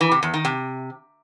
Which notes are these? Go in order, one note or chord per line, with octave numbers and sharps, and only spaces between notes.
E3
C3
E2
D#3
C3